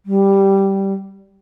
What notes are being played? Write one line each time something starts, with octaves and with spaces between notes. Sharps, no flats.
G3